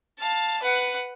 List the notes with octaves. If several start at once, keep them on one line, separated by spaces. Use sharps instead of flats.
F5 A5
B4 F#5